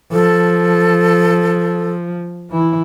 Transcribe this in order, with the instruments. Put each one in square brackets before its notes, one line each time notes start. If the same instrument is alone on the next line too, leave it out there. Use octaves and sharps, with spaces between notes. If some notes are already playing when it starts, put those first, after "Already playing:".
[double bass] F3 [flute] A4
[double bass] E3 E4